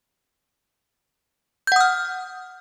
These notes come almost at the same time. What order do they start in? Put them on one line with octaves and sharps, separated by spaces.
G6 F#5 D#6 F6